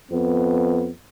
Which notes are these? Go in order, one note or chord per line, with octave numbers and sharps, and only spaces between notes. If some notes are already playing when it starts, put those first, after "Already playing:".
F2 B3